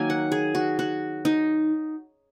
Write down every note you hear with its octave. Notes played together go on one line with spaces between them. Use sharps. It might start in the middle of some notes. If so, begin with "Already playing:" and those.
Already playing: D#3 F#3 A#3 G#5
F#5
G#4
F#4
F#4
D#4